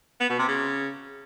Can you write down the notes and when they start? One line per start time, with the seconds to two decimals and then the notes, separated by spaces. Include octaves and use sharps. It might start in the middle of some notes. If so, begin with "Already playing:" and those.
0.20 B3
0.30 B2
0.39 C3
0.48 C#3